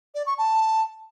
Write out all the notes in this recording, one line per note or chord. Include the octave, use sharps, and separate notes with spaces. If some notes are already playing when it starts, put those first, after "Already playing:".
D5
C#6
A5